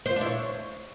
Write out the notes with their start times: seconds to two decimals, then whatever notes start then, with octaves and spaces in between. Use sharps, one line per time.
0.06 C5
0.11 F4
0.16 D4
0.21 E4
0.26 C#5